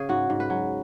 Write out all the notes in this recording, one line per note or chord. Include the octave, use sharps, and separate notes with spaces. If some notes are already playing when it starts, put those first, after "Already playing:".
Already playing: C#3 G#4
G#2 F#4
G#2
B4
F#3